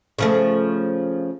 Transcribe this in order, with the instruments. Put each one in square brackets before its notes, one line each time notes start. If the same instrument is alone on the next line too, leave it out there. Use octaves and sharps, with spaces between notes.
[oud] C#3 F3 A3